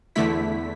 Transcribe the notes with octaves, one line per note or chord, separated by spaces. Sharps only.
E2 D3 A3 E4 B6